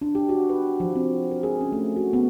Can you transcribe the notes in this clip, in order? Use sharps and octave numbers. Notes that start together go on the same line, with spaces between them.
D4
G4
F#4
B4
F3
C4
A#4
G#4
C#4
A3
F#4
B3